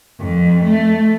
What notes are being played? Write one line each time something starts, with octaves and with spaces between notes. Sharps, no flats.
F2
A3